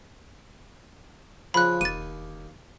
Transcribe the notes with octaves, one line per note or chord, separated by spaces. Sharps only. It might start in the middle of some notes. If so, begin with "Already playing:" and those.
C#3 F3 B5 F#6
E1 D#2 A6 D#7